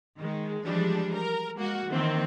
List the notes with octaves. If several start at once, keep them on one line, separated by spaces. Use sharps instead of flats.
D#3 G#3
E3 F3 G3 G#3 D4
A#4
G#3 A#3 F#4
D#3 E3 A#3 C4